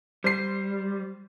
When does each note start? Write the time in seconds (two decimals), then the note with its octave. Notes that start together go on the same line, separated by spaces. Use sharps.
0.24 G3 C5 C7